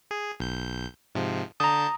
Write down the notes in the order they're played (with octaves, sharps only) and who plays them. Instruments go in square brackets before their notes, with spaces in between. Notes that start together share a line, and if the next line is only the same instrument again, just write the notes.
[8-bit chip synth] G#4
B1 G6
G#2 C3 F3
[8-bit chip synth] D3 A5 G6 [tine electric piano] A#5 D#6